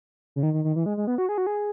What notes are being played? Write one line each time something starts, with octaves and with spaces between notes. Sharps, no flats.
C#3
D#3
D#3
D#3
E3
G#3
G#3
B3
F#4
G#4
F#4
G#4